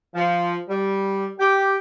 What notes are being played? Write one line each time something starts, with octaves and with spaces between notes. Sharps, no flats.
F3
G3
G4